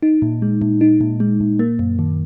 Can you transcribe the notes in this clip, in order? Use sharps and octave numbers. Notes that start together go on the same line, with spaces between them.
D#4
A#2
G#3
A#2
D#4
A#2
G#3
A#2
A#3
F#2
D#3